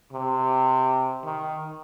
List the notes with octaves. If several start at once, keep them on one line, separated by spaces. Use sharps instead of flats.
C3
D#3